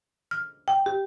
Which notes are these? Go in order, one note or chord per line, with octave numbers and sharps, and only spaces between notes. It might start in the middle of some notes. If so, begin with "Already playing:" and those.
F6
G5
G4